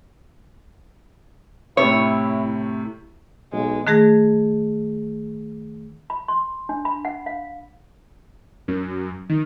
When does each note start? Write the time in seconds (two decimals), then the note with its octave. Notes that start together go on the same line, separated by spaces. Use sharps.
1.77 A2 C3 A3 E4 C#5
3.53 B1 G#3
3.87 D#3 A3 G#4 A#6
6.10 B5
6.28 C6
6.69 D4
6.85 B5
7.05 F#5
7.26 F5
8.68 F#2
9.29 D#3